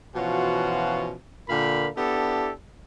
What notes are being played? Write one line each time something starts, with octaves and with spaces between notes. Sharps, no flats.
B2 E3 F3 C#4 F4 F#4
A#2 D3 A#4 F5 G5 B5
B3 D4 E4 G4 A4